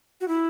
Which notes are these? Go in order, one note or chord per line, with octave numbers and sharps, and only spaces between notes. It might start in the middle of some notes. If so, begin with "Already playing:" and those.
F#4
E4